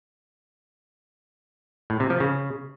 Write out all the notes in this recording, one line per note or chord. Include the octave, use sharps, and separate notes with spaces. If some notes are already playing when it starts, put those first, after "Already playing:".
A2
C3
F3
C#3